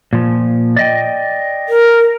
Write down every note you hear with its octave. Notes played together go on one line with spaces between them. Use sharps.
A#2 F3
D5 D#5 G5
A#4